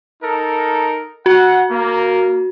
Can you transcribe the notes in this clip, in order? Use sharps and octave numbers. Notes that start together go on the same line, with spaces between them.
D#4 A4 A#4
F#4 F#5
A#3